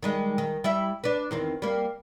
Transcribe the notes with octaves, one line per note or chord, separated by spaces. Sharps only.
D#3 G3 G#3
D#3
G3 E4 E5
D4 B4
E2 D#3 C4
G3 A#3